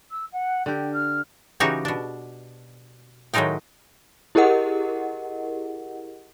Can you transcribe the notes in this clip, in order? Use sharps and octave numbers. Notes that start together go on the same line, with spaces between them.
E6
F#5
D3 G4 G5
F6
C#3 E3 D#4 F#4 G4 C#5
B2 D4
A2 D#3 F#3 G#3 D#4 G5
E4 G4 G#4 A#4 D#5 F#5